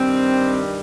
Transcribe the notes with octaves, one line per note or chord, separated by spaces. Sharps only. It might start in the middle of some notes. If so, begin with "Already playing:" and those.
Already playing: G2 D#3 G3 C4